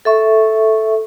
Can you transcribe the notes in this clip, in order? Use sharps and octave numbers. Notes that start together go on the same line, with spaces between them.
A4 E5 C#6